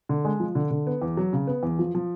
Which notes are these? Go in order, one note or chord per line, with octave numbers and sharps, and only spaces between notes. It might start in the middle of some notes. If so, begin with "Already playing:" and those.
D3
G#3
F3
D3
D3
B3
E2
F#3
C#3
B3
E2
F3
F3